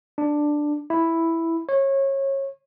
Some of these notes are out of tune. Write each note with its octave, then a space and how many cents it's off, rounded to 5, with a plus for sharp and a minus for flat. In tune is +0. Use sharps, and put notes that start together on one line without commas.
D4 +10
E4 +0
C#5 -25